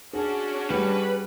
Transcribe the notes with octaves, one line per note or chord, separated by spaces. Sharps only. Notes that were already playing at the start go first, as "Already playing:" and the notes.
C#4 D4 F#4 G#4
G3 B4